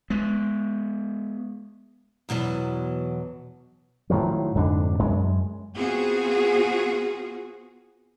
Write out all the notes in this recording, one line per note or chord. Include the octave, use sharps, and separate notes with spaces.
G#3 B3
E2 B2 E3 F#3
A2 D#3 F3 F#3
F2 G#2 D3 D4
F#2 G#3
B3 C4 F4 F#4 G#4